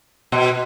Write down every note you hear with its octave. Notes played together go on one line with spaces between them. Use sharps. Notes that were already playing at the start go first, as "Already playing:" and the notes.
B2